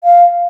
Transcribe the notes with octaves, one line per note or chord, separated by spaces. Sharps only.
F5